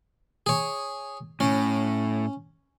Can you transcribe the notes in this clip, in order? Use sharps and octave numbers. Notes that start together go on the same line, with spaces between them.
G#4 C#5
A2 C#4